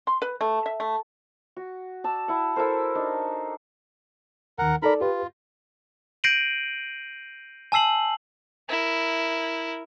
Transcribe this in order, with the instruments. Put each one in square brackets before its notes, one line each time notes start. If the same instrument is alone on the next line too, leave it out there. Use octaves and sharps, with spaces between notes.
[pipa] C6
B4
A3
E5
A3
[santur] F#4
D5 A5 E6
E4 F#5
E4 A4 A#4 C5
D4 D#4
[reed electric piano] D#2 D#3 [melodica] A#4 F#5
[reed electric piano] D#4 A4 D5 [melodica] A#4 B5
[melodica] F4 [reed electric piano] G4 B4
[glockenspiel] G6 A#6 C7 D7 D#7 F#7
G#5 A5 E6 C7 F#7
[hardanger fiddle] E4 A#4